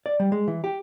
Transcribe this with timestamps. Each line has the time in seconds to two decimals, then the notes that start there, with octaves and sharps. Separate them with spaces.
0.06 D5
0.20 G3
0.32 G#3
0.48 E3
0.64 G4